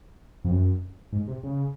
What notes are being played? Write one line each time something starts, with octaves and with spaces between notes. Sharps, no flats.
F2
F#2
G#2
C3
C#3